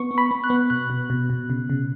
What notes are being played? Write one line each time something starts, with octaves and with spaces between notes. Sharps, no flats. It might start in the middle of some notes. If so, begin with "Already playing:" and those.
Already playing: B3 C#6
B3
B5
B3
F#6
B3
B2 F#6
B2
B2
B2
C#3
C#3